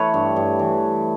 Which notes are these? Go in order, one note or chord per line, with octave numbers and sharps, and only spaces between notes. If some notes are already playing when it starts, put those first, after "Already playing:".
Already playing: E3 A3 B4 C#5
G2
G2
E3